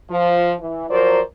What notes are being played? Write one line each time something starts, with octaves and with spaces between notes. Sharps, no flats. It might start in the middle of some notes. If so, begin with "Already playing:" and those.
F3
E3
F3 F#3 A#4 C5 D5